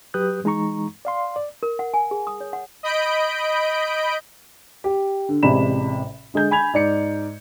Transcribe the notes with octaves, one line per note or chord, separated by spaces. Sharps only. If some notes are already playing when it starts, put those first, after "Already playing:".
F#3 G4 B4 D#6 F#6 G6
E3 G#3 D#4 A#5 C#6
D5 F5 C6
D5
A#4
F#5
G#5
G#4
D#6
C#5
F#5
D#5 B5 G6 D7
G4
D3
A1 C3 G#3 D5 B5 E7
D3 G#3 G#4 G6
G#5 B5 G#6 F7
G#2 D5 C#7